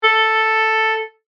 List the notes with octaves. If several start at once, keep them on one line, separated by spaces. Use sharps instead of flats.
A4